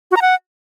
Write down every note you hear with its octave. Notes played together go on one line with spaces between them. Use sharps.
F#4
A#5
F#5